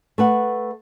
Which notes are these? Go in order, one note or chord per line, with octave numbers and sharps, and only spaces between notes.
A3 B4 F#5